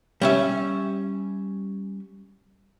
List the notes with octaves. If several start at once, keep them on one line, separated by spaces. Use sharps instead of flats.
G3 C#4 E5